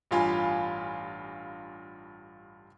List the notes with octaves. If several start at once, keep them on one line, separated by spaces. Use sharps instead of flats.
A1 G2 F4 F5 G#5 B5